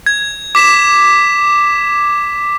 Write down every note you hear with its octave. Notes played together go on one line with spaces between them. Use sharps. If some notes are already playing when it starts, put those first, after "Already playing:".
G#6
D6 B6 E7